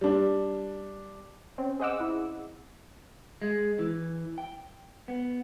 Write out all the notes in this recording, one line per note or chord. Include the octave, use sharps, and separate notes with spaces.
G3 D4
C4 C#4
G#4 C5 D#5 F#5 D6 E6
E4
G#3
E3
G5
B3